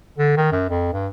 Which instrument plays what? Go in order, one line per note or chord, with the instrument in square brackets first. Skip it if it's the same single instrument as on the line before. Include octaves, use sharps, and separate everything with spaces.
[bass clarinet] D3
D#3
F#2
F2
G2